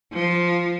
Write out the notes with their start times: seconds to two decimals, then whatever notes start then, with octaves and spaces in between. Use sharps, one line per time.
0.13 F3